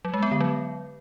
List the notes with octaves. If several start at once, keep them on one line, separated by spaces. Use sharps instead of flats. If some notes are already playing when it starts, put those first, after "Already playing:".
F#3
G#3
B3
D3
F#3